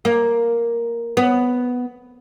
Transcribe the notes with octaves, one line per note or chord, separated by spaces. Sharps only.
A#3
B3